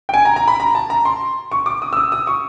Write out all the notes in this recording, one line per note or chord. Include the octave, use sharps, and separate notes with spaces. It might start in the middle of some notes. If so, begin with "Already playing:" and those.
G5
G#5
A#5
A#5
B5
A#5
A5
A#5
C6
C#6
D6
D#6
E6
D#6
D#6
C#6